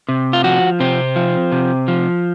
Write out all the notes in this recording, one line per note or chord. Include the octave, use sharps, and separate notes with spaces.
C3
F4
F3 F#4
C3 C4
F3
C3
F3